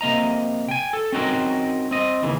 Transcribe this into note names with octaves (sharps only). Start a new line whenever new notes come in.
C3 A#3 D#5 A#5
G5 G#5
A4
C4 C#4 D#4 F#4 A#4
C4 D#5
D#2 C#3 E3